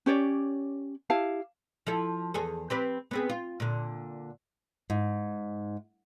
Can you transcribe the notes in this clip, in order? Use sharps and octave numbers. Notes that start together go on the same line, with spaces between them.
C#4 G4 C#5 D5
E4 G4 F5 A5
F3 E4 A4
E2 G#4 A4
C4 G4 B4
B3 C4 G#4
F4
A#2 D3
G#2